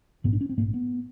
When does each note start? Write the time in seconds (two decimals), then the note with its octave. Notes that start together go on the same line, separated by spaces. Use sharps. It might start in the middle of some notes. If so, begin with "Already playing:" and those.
0.24 A#1 G#2 B3
0.33 D4
0.41 C#4
0.49 C4
0.57 G#2 A#3
0.61 A#1
0.74 B3